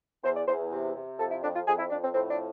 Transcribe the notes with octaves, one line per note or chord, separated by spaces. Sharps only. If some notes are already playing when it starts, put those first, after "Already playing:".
E2 C5
D5
E2 C5
C3
C3
F2 A4
E4
F2 D4
F4
F2 G#4
E4
F2 D4
C4
A2 C4
D4